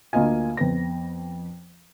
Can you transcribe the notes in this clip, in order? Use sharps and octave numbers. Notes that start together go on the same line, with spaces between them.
D2 A#3 F4 D#5 G#5
F2 B3 B4 A#6